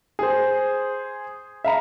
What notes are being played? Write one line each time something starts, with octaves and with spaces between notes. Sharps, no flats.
G#4 C5
E5 F5 A#5 B5